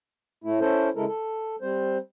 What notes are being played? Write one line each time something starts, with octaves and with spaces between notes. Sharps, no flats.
A2 A3 E4
C#4 E4 A4 C5
C#3 G#3 E4 A4 A#4
A4
G3 C4 C5